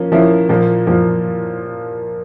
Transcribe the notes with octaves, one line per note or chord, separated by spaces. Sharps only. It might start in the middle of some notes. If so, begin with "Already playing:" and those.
Already playing: F3 A#3 C#4
F3 A#3 C#4 E4
A#2 F3 A#3
A#2 F3 A#3